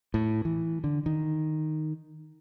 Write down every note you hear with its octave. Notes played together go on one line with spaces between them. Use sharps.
A2
E3
D3
D#3